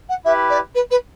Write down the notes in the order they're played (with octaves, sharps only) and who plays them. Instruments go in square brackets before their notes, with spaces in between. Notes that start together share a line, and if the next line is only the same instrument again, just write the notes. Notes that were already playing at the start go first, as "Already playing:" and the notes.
[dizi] F#5
[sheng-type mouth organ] E4 G4 B4 [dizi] E5
[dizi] D5
B4
B4